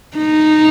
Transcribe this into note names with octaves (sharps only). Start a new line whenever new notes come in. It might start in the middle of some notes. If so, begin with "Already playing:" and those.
D#4